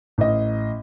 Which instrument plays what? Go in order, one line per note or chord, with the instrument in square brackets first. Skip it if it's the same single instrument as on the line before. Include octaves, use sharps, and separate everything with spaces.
[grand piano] A1 D#5